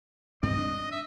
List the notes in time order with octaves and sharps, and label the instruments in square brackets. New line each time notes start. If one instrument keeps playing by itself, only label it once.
[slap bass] G2 C4 [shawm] D#5
[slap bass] D4
[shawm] E5